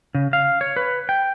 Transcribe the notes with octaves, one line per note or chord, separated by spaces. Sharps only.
C#3
F5
C#5
B4
G5